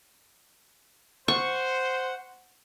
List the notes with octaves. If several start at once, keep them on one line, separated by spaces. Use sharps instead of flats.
C5 F#5 C#6